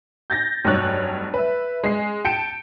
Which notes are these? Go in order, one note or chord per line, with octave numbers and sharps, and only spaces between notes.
G6 A6 A#6
F1 G2 F#3 C#5 F#6 A6
B4 E5
G#3 C7
G5 A5 C#7 D7 E7